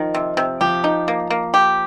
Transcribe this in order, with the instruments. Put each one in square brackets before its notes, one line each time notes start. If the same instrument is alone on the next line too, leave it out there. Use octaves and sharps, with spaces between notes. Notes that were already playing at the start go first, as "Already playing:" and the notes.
Already playing: [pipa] D#3 [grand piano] F3
[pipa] C3
C3
[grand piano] F3 [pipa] G4
[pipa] D#4
A#3
A#3
G4